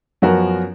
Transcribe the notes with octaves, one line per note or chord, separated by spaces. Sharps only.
F#2 F3 B3 F#4 A#4